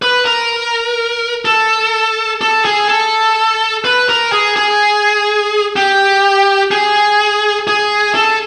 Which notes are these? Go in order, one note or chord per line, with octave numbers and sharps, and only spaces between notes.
B4
A#4
A4
A4
G#4
A4
B4
A#4
G#4
G#4
G4
G#4
G#4
A4